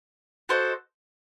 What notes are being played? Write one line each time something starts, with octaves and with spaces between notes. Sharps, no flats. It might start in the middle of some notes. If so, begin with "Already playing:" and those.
F#4 A4 C5 D#5